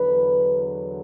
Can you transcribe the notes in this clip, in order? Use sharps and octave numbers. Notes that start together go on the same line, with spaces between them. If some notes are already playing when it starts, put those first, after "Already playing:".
Already playing: E2 D3 F#3 B4